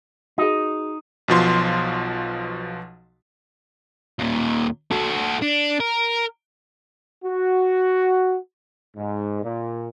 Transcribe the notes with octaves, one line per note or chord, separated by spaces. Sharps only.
D#4 F#4 G#4
B1 B2 F3 C6
D#2 A#2
F#4 A4
D4
A#4
F#4
G#2
A#2